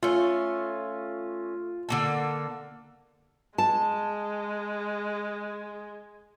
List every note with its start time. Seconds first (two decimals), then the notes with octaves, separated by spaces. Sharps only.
0.03 A3 C#4 F4
1.89 D3 A#3 A4
3.58 G#3 A5